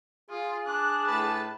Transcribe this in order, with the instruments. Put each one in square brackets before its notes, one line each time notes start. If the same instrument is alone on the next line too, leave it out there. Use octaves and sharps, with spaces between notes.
[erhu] F4 [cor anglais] G#4
[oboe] D4 [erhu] F#6
[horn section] A2 B4 [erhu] A5